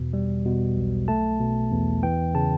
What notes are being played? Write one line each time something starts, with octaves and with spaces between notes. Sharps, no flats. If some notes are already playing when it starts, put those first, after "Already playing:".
Already playing: E2 B2
G3
B2
B1
A3 A5
B2
E2
E3 G5
C#3 A5